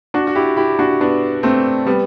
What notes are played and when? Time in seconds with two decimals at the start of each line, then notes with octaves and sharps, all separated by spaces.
0.14 D4 F#4
0.27 F#4
0.35 E4 G4
0.57 E4 G4
0.79 D4 F#4
1.01 B3 D4
1.43 A3 C4
1.86 G3 B3